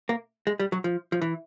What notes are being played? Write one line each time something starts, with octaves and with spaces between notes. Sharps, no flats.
A#3
G#3
G3
F#3
F3
F3
E3